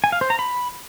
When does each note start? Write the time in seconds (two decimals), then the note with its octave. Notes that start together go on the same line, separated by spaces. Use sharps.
0.04 G#5
0.12 F5
0.21 C5
0.30 A#5
0.39 B5